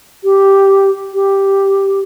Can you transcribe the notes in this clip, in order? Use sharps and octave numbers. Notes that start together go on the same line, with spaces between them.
G4
G4